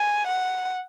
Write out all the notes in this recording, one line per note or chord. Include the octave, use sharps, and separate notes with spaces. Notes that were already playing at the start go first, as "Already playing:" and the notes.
Already playing: G#5
F#5